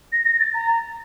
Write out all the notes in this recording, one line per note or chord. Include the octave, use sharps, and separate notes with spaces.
A#6
A#6
A6
A#5